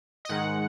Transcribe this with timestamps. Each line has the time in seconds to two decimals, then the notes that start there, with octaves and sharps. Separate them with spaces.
0.25 D#5
0.29 G#2 D#3 G#3 F#5